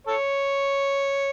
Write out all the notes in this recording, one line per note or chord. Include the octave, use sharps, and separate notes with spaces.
A4 C#5